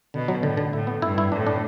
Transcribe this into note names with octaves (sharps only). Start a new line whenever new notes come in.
B2 D3
F#3
A2 D3
D3
A2 E4
B3
G2 E4
E4
A2 D4
D4